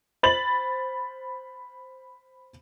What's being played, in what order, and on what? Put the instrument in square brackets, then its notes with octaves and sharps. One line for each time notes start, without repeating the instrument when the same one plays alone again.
[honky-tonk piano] C5 B5 A6 F#7